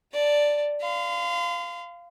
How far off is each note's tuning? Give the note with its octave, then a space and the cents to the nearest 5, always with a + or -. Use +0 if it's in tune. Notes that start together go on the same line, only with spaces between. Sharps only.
D5 +0 A5 +15
F5 -10 C6 -40